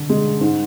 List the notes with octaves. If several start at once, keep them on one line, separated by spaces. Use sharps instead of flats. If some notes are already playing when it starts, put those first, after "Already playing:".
Already playing: D3
G#3
G#2